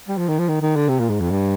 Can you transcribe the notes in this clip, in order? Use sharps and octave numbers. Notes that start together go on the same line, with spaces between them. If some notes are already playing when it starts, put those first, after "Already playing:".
G3
F3
D#3
F3
D#3
D#3
D3
C3
A#2
G#2
F2
G2